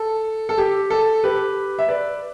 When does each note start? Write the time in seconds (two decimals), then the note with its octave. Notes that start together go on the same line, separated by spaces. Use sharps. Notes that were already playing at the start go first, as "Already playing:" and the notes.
Already playing: A4
0.49 A4
0.58 G4
0.90 A4
1.23 G4 B4
1.79 E5
1.89 B4 D5